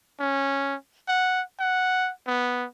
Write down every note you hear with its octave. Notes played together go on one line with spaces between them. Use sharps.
C#4
F#5
F#5
B3